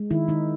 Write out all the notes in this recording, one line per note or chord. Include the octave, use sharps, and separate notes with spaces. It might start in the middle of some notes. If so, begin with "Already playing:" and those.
Already playing: G#3
D#3 E4
D#3 D#4